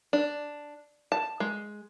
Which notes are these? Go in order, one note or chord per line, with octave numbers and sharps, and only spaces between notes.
D4
A5
G#3